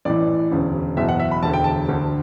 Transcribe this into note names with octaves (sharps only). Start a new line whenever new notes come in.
A1 A2 E3 D5
E1 D2 C#3
F#1 E2 B2 E5
F#5
E5
B5
E1 D2 D3 A5
G5
A5
D2 D3